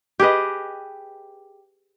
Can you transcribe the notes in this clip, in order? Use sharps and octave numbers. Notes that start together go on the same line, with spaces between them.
G4 G#4 B4 D#5